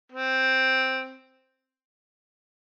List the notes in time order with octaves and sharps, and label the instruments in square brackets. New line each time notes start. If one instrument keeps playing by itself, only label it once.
[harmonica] C4